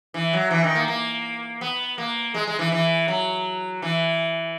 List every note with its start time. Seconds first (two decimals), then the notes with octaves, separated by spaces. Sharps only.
0.14 E3
0.33 F#3
0.51 E3
0.64 D#3
0.75 A#3
0.88 A#3
1.61 B3
1.98 A#3
2.34 G#3
2.47 G#3
2.59 E3
2.72 E3
3.08 F#3
3.82 E3